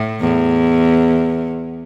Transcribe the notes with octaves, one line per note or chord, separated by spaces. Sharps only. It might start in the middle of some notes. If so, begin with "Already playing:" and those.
Already playing: A2
E2